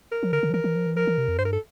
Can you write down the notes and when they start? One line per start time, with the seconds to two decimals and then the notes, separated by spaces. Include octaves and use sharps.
0.12 A#4
0.23 F3
0.33 D3 A#4
0.43 D3
0.50 F3
0.54 E3 A#4
0.64 E3
0.76 F3
0.86 E3
0.96 F3 A#4
1.07 E3
1.18 C3
1.28 F2
1.39 G2 C5
1.45 A#4
1.53 A4